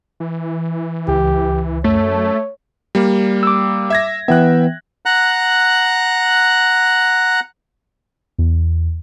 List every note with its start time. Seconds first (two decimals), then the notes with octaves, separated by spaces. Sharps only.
0.20 E3
1.08 C#2 G4
1.84 F#2 A3 C#5
2.95 G3 A#3
3.43 D6 E6
3.90 E5 G#6 A#6
4.28 E3 B3 E5 G5 F#6
5.06 F#5 A#5 F#6
8.38 E2